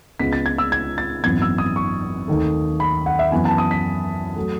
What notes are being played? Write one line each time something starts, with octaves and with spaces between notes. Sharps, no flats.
C#2 C#3 G#3 B3 B6
A6
G#6
E6
G#6
A6
G#1 F#2 E3 B3 G#6
E6
D#6
C#6
D#2 D#3 A3
B5
F#5
E5
F#2 E3 B3 G#5
A5
D#6
B6
F#3 A3